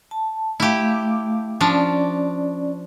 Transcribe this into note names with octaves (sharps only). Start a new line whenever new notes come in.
A5
A3 E4 G4 F5
F3 C#4 D4 D5